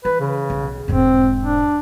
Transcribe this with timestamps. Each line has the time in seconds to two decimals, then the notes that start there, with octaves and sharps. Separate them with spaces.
0.05 E3 B4
0.20 C#3
0.50 B1
0.88 E1 G#2 C4
1.40 D4